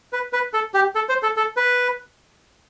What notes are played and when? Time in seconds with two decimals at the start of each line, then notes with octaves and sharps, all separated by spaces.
0.13 B4
0.33 B4
0.54 A4
0.74 G4
0.95 A4
1.09 C5
1.23 A4
1.37 A4
1.57 B4